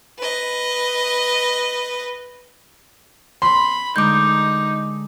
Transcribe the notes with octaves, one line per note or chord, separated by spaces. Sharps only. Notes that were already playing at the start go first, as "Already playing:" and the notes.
B4 D#5
B5 C6
D3 G#3 D#4 A#4 D6 G6